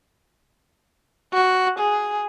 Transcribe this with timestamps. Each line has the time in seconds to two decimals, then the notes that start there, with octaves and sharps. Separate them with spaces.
1.33 F#4
1.79 G#4